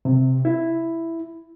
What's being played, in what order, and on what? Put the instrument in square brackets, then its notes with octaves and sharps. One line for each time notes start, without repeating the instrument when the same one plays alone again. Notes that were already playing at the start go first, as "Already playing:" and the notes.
[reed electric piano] C3
E4